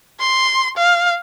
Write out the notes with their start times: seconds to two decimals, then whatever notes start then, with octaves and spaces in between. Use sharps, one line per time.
0.20 C6
0.77 F5